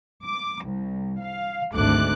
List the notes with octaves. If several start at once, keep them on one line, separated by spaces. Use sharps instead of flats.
D6
C2
F5
G#1 D2 A3 D6 F#6